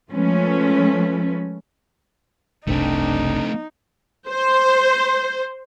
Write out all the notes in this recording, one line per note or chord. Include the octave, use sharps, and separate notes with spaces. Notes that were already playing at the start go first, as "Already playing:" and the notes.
F3 G#3 A3 C#4 B4
F#1 C2 C3 A3 C4 D4 D#4
C5